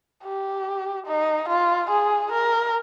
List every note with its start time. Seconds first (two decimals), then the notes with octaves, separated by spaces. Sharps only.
0.24 G4
1.07 D#4
1.48 F4
1.90 G#4
2.32 A#4